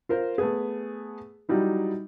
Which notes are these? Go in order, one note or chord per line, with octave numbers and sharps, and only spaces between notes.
F4 A#4 C5
A3 B3 G#4
F#3 G3 D#4 E4